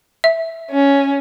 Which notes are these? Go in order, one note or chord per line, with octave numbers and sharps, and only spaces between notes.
E5
C#4